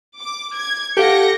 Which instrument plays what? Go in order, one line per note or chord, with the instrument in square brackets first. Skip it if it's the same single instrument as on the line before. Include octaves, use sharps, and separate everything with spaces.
[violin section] D6
G#6
[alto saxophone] G4 [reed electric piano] A4 F5 F#5 [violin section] A#6 C#7